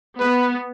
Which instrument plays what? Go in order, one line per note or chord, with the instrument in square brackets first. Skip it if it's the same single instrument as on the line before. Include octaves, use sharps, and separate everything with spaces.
[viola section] B3 [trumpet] B4